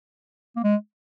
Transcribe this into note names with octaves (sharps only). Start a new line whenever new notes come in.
A#3
G#3